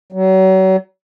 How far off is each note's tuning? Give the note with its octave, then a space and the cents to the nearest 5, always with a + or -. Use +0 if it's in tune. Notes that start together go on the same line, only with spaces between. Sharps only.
F#3 +40